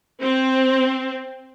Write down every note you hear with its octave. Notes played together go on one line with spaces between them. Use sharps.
C4